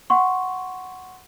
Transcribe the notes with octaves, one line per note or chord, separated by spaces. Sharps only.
F#5 C6 C#6